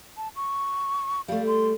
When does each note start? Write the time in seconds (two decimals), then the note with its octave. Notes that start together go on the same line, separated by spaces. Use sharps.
0.17 A5
0.36 C#6
1.28 G3 A3 F5
1.47 C6